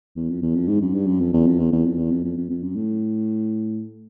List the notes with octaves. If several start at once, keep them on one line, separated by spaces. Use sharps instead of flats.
E2
F2
E2
F2
G#2
F#2
G2
F#2
F2
E2
F2
E2
E2
F2
E2
F2
F2
F2
F2
F#2
A2